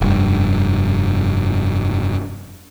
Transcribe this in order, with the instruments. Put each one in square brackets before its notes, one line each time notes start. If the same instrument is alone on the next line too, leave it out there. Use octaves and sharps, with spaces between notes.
[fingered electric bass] F1 G2